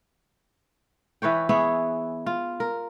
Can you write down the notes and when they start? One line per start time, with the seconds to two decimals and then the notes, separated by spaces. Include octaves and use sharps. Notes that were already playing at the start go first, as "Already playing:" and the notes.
1.22 E3 B4 C#5 G5
1.49 B3 E4 G#4 C#5
2.26 F4
2.60 A#4